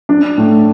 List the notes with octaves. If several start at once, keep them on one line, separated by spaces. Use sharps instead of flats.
D4
A2